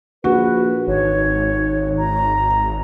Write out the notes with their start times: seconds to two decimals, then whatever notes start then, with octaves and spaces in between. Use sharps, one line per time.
0.24 A#1 F#4 B4
0.88 G#1 D#3 C#5
1.98 A#5